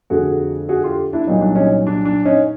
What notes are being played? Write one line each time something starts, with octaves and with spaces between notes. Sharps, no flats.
F2 D3 F3 A3 F#4 G#4
F#4 G#4
F4 G4
D4 E4
C2 A#2 F#3 D#4
D4
C#4 D#4
D4
D4
C#4 D#4